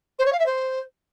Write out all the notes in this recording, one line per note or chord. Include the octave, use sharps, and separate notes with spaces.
C5
C#5
F5
E5
C5